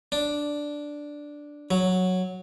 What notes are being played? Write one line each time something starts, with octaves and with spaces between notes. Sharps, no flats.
D4
F#3